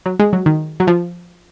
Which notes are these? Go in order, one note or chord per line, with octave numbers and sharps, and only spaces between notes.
F#3
G#3
F#3
D#3
F#3
F3